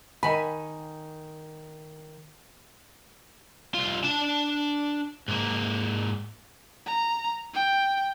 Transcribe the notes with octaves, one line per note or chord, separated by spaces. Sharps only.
D#3 G#5 B5
C2 F4
D4 A5
G#2 A#3
A#5
G5